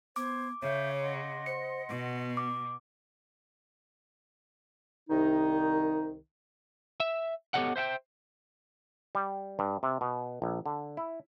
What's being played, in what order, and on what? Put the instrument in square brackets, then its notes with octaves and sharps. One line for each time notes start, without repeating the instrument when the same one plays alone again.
[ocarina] B3 [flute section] C5 G#6 [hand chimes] D6
[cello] C#3 [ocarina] C#5 [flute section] E5 G6
[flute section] D#5 F#5 C6
[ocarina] C5 [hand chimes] C#7
[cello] B2 [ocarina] B3
[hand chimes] D6
[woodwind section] C2 D#3 D#4
[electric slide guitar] E5
B3 G4 A4 C#5 D#5 F#5
C5 E5 F#5 G5
[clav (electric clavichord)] G3
G2
C3
B2
A#1
D3
E4